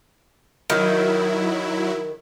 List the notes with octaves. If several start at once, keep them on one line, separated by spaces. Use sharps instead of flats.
D#3 F#3 E4